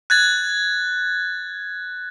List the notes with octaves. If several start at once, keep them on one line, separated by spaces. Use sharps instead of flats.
F#6 G#6 A6